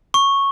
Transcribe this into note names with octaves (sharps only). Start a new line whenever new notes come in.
C#6